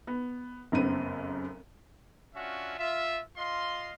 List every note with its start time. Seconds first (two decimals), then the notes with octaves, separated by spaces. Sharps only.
0.07 B3
0.72 F1 F#2 C#3 B3 C4 D#7
2.35 C#4 D4 F4 F#4 E5
2.79 F4 E5
3.36 F4 D#5 F5 C6